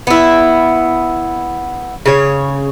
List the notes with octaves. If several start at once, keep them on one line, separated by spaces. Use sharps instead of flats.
B3 E4
C#3 C#5